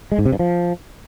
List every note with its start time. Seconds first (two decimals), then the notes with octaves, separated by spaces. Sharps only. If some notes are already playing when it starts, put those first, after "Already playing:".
0.12 G#3
0.19 G#2
0.26 C3
0.32 G2
0.39 F3